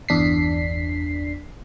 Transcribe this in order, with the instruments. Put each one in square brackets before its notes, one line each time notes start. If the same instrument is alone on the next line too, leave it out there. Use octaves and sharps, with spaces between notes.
[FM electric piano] G1 E2 D4 B6 C7